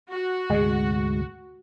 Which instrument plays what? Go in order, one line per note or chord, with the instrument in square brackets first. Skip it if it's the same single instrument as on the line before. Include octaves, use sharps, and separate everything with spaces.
[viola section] F#4
[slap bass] D2 G#2 C3 [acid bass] G#3